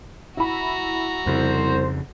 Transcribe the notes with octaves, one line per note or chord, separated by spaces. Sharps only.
E4 F#4 A#5 B5
C2 F2 C#3 C5